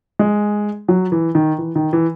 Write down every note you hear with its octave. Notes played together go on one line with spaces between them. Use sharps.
G#3
F#3
E3
D#3
E3
D#3
E3